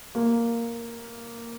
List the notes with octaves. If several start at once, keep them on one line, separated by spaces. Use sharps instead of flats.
A#3